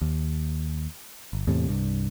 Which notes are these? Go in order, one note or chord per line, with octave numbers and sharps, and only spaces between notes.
D#2
G1
E2 A2 C3
C2 G2